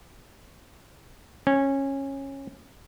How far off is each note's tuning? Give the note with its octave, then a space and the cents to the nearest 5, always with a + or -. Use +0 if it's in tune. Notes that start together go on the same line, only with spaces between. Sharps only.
C#4 -20